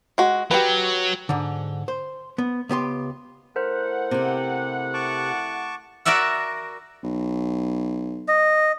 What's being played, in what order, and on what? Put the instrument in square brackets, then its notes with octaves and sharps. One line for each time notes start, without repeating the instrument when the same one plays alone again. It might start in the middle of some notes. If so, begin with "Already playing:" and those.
[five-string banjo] G#3 F#4
[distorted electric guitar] F#3 [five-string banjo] G4 B4
[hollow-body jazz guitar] G#2 D3
C5
B3
C#2 B3 G4 C6
[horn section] A3 E4 F#5 [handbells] A#4 C5
[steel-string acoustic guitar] C3 G4
[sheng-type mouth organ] A5 C#6 D6
[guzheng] F#4 A#4 D5 E5 F#5
[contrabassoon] B1
[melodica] D#5